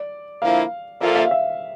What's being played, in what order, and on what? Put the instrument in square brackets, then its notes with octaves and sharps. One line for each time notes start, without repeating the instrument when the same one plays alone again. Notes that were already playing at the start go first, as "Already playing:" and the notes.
Already playing: [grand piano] D5
[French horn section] D3 F3 A#3 E4 [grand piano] F5
[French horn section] A#2 F3 A#3 F4 A4 [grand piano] E5
[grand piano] E5
F5
E5